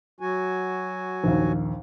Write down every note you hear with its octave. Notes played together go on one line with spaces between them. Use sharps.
F#3 F#4 G#5
A#1 D#2